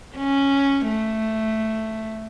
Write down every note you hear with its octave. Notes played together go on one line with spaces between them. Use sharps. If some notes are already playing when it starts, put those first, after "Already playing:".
C#4
A3